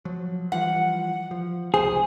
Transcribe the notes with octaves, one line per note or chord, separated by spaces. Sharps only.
F3 F#3
E3 F3 G3 F#5
F3
F1 C#2 G#4 C5